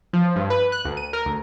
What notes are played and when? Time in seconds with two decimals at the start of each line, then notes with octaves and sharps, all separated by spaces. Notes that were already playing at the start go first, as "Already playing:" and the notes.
0.13 F3
0.36 G2
0.50 B4
0.72 F#6
0.85 D2
0.97 D#7
1.13 A#4
1.26 D2